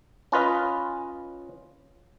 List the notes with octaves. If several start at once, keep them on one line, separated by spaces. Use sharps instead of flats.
C#4 F4 B4 D#5